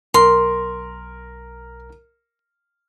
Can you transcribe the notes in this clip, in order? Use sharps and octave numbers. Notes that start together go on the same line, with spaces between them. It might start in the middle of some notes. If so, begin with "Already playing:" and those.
B1 A#4 C6